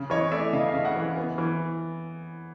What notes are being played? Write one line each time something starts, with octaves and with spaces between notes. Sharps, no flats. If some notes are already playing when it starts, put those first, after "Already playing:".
Already playing: C#3
E3 C#5 D#5
A3 D5 E5
C#3 D#5 F5
D#5 F5
C#3
E5 F#5
E3
B3
E3